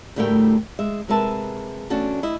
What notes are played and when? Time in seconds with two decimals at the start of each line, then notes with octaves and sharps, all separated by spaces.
0.16 D2 A2 G3 A3 A#4 G5
0.79 G#3 E5
1.08 C3 G#3 A#4 B4 E5 A5
1.90 E2 A3 C#4 D4 F#4 A5
2.23 E4 D#5